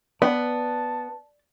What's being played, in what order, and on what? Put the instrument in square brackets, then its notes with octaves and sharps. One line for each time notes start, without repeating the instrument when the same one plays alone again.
[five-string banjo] B3 [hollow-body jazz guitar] D5 [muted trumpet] A5